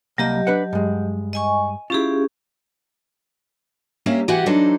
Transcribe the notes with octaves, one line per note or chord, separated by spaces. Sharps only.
C2 F#3 A#3 G4 D#5
D4 B4 F#5
G2 G#3
D#5 G#5 C#6
C#4 E4 F4 G4 G#4
A#3 C#4 G4 E5 F5 A#5
E3 F#4 G4 F#5 G#5
E3 F#3 D4 D#4 A4 C5